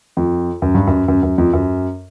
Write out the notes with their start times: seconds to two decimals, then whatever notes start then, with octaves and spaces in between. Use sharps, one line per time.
0.17 F2
0.62 F#2
0.75 G2
0.87 F#2
1.08 F#2
1.23 F#2
1.38 F2
1.53 F#2